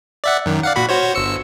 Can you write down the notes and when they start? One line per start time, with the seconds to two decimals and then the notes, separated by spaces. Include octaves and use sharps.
0.24 D5 E5 F#5
0.46 F#2 D#3
0.63 D5 F5 F#5
0.76 A#2 F#4 B5
0.89 F#4 C5 C#5
1.15 G1 E6 C#7